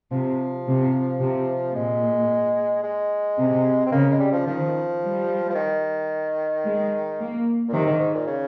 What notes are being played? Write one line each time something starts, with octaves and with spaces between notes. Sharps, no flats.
C3 F3
C3
C3
A#2 G#3
G#3
C3
C4
C#3 A#3
G#3
G3
F3
D#3 F3
G3
F3
D#3
G#3
A#3
A#2
C3 D#3
G#2
G#2
A#2
C#3